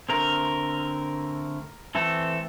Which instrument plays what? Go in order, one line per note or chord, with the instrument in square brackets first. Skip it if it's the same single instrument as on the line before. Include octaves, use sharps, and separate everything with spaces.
[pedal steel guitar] D3 A3 C4 A#4
E3 A3 C4 A4